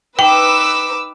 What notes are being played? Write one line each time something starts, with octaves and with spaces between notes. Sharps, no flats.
D#4 B4 G5 D6 E6